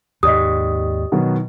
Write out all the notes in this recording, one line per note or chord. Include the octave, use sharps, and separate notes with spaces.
D#2 G#2 G4 D5 D#5 D#6
B2 D#3 F#3